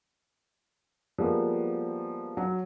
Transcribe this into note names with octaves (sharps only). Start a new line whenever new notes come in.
F3 G3 G#3 A#3 B3 G4
F#3